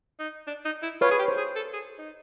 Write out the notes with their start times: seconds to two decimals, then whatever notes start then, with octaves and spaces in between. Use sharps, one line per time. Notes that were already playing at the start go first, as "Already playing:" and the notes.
0.19 D#4
0.47 D4
0.65 D#4
0.83 E4
1.01 F4 B4 C#5
1.11 G#4
1.19 G4
1.28 C5
1.38 G#4
1.56 A4
1.74 G#4
1.99 D#4